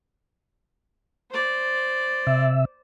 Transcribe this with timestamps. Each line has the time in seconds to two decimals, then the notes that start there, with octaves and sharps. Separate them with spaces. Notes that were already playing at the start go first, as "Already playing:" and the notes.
1.30 C5 D5
2.27 C3 E5